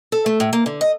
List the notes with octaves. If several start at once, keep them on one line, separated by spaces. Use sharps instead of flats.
A4
A3
A2
A#3
D3
D#5